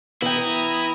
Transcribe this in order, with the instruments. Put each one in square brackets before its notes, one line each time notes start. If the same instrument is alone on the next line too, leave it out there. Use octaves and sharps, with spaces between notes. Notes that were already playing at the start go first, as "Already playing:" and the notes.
[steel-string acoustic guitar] E3 [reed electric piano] B3 G5 [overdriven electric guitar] E4 [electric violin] A#5 D#6